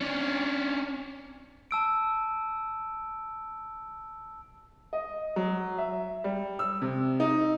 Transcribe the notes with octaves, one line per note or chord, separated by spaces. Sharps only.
C#4 D4
A5 E6 D7
D#5
F#3
E5
G3
E6
C3
D#4